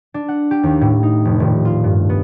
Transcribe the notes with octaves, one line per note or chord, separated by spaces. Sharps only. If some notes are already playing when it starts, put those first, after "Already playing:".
D4
F#5
G4
D#2
A2
D#4
F1
D#1
F4
G2
B3